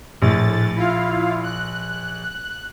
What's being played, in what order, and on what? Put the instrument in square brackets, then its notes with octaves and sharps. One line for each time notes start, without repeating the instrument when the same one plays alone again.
[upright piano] A#1 [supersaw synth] A2 A6
[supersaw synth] E4 F4 F5
F#6